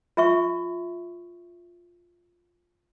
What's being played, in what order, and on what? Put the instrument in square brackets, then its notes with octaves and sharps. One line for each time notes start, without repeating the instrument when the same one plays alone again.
[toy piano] F4 E5 C#6